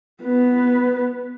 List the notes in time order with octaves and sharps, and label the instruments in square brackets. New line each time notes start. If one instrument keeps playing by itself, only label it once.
[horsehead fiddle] B3 B4